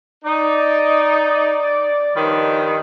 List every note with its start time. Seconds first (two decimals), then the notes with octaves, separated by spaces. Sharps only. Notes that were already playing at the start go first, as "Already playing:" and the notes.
0.25 D#4 D5
2.15 G2 D#3 F3 C#5 B5